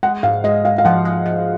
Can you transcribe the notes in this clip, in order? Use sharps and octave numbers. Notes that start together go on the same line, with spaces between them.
G#3 F#5
G#2 F5
G#3 D#5
G#3 F5
F5
F3 F#5
G#3
F3